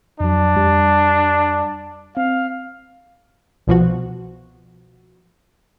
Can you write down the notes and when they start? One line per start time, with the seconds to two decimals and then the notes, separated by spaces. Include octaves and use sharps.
0.20 F2 F#3 D4
0.56 F2 G3
2.17 C4 F5
3.67 C2 B2 F3 F#4